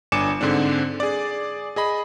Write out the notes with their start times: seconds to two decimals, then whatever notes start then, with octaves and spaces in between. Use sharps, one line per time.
0.12 G1 D4 G#5 D6 C#7 E7
0.41 G#2 D3 C4 D4
1.00 G#4 D5
1.76 G#4 D#5 B5